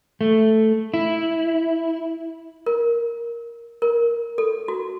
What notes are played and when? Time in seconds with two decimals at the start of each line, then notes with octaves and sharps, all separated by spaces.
0.21 A3
0.94 E4
2.66 A#4
3.82 A#4
4.38 A4
4.68 F#4